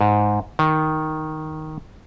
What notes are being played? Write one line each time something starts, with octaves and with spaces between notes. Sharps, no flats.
G#2
D#3